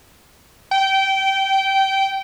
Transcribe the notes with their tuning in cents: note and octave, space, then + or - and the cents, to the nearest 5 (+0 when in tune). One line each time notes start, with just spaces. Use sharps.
G5 -20